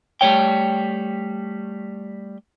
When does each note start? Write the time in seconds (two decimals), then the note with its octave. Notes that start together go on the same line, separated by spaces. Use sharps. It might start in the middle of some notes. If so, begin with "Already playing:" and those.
0.21 G3 A3 C#5 G5